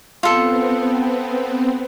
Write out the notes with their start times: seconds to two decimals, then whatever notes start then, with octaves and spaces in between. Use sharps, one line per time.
0.23 B3 C4 F4 A4